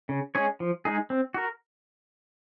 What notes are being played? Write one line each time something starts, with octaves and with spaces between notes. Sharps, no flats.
C#3
G#3 C#4 G#4 C#5
F3
G#3 D#4 G#4
C4
F#4 A#4